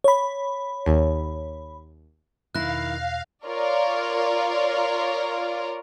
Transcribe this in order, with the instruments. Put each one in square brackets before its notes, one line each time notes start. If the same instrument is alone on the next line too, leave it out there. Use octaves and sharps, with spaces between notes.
[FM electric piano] C#5 B5
[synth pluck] D#2
[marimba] E2 B2 [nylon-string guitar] D#3 E4 [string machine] F5 [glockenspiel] F#6 A#6
[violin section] F4 A#4 C#5 D5